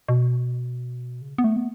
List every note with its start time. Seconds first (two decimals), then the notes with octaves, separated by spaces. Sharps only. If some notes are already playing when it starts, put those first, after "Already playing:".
0.08 B2
1.22 C#3
1.38 B3
1.44 A3
1.56 B3